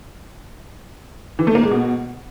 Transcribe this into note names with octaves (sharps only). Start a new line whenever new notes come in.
E3
A3
A#3
G#3
B2